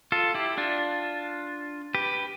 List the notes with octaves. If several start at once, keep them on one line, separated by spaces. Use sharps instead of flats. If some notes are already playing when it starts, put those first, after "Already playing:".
F4 A4
E4 G4
D4 F4
G4 B4